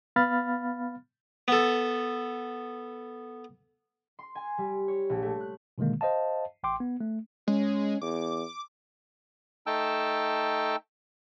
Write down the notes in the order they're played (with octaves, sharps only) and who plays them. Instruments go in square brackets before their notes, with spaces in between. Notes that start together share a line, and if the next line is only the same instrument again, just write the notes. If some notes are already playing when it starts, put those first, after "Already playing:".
[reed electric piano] B3 F5 B5 F6 A6
[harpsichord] B3 A4
[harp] C6
G#5
G3
C#5
A#1
A3
F#6
[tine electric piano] B2 D3 D#3 G#3 A#3
C5 D#5 F5 A5
A1 G5 C6 D6
B3
A3
[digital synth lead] G#3 [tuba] C#4
[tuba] E2 [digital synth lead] D6
[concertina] A3 D#4 G5 A5 E6